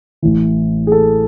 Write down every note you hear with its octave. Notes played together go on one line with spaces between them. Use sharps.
A1 A2 E3
G#4
A4